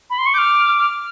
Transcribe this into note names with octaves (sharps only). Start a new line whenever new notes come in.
B5
C6
C#6
D6 F6 G6
F6